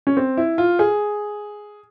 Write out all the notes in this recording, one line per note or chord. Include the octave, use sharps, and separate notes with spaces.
C#4
C4
E4
F4
G#4